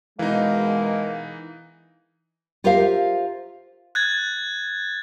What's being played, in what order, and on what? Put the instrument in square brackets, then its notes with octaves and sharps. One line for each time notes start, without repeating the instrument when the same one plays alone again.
[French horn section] B2 G#3 [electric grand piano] E3 D#4 [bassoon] A#3
[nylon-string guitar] F4 G4 A#4 C5 E5 F5
[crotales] F#6 G#6 A6